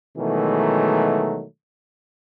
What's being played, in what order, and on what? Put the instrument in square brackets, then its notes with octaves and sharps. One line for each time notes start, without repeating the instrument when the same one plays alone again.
[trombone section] B2 D#3 E3 F#3 G#3 A3